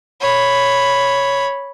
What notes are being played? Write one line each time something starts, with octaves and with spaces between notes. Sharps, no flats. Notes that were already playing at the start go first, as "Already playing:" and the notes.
C#5 B5